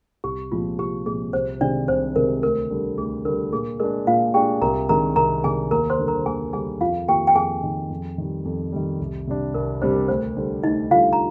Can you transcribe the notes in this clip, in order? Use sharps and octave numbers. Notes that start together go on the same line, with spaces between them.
C2 G4
A#2 F3 G#3 C4 F4
C2 G4
A#2 F3 G#3 C4 G#4
C2 C5
C3 D#3 G#3 D4 D5
C2 C5
C3 D#3 G#3 A#4
D2 A#4
D3 G3
D2 G#4
D3 G3 A#4
A#2 G#4
G#3 D4 A#4
A#2 F4 F5
G#3 D4 G4 G5
C2 A#4 A#5
C3 D#3 G#3 D4 A#4 A#5
C2 A#4 A#5
C3 D#3 G#3 D4 G#4 G#5
D#2 A#4 A#5
C5 C6
D3 G3
A#4 A#5
D#2 G#4 G#5
D3 G3 G#4 G#5
F2 F4 F5
D#3 A#3 D#4 G4 G5
G5
F2 G#4 G#5
D#3 A#3 D#4
F2
D#3 G3
F2
D#3 G3
C2
C3 G3 D4
C2 A#4
C3 G3 D4 C5
A#4
D2 C5
D3 G3
D2 D#4 D#5
D3 G3 F4 F5
A#5